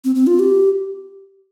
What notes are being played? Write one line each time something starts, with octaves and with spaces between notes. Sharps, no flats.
C4
C4
F4
G4